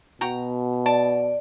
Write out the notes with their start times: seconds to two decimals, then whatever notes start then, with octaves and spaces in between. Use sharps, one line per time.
0.21 B2 F#4 G5 A#5
0.86 D5 A5